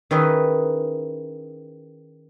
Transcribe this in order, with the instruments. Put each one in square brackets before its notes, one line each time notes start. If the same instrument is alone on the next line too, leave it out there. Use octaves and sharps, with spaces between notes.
[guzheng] D#3 C#4 E4 G#4 B4 D#5